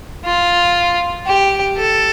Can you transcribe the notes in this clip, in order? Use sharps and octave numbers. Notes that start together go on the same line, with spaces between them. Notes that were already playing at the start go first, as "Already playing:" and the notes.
F4
G4
A4